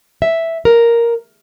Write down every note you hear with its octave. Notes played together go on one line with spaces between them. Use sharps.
E5
A#4